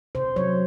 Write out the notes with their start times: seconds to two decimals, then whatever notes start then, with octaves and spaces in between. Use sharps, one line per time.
0.15 C3 C5
0.36 F#3 C#5